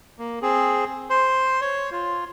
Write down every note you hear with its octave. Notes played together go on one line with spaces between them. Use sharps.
A#3
C4 G#4
C5
C#5
F4